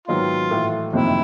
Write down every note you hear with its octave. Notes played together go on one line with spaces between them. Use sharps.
G#2 D#3 F#3 B3 F4
A2 E3 A3
F#1 F2 C3 D#3 E4